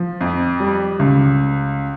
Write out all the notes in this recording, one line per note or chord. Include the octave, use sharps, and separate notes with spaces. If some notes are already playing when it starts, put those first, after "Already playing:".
Already playing: F3
F2
G3
C#2